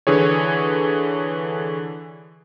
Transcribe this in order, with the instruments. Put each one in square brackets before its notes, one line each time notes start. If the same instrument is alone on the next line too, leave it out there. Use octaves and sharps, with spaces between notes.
[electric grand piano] D3 E3 G#4 C#5